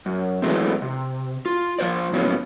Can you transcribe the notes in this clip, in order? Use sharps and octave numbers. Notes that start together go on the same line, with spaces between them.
F#2
E3 F#3 G#3 A3 C4
C3
F4
F3 F4 C5 D5
A2 F3 F#3 B3 C#4